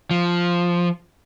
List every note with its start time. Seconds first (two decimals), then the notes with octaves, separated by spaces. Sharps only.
0.11 F3